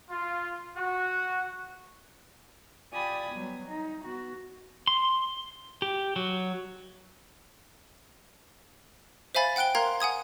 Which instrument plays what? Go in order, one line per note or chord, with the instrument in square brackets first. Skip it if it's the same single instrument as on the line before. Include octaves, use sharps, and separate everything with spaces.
[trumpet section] F4
F#4
[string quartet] F4 G4 D5 G#5 B5 D#6
F#3 G3 B3
D#4
B3 F#4
[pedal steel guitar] C6
G4
F#3
[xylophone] C5 E5 F5 G#5 B5 A6
F#5 G5 F#6 D7 G7
A#4 F5 A#5 C6 G#6
F#5 G#5 D#6 G#6